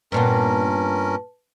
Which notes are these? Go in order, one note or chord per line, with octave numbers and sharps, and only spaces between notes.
G2 A#2 B3 C#4 A#4 B4 A5